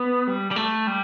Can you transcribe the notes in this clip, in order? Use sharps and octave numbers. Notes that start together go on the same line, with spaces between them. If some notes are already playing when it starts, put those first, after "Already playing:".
Already playing: B3
G3
G3
A3
G3